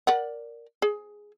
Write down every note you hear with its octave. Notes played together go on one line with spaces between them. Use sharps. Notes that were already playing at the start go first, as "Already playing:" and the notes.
A#4 D5 F#5
G#4